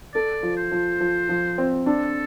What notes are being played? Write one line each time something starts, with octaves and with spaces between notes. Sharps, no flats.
A4 D5
F3
C5
F3
F3
F3
C4
D4 A4